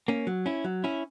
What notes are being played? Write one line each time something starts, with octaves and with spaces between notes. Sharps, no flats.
A#3 C#4
F#3
C#4 E4
F#3
C#4 E4